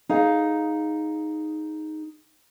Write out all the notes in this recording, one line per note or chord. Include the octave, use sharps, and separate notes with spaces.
D#4 G#4 F5